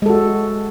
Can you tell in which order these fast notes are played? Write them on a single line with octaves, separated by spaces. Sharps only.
G#3 A4 F#4